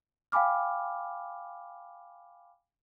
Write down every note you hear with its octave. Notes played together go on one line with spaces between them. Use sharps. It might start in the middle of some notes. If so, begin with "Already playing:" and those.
F5 G5 G#5 B5 D6 F6